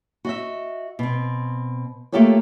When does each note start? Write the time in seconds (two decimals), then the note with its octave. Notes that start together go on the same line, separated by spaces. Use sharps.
0.25 F#4 D#5 E5
0.99 B2 C4
2.12 A3 A#3 F4 G4 A4 C#5